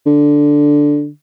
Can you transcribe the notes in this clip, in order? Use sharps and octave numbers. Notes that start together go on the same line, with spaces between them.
D3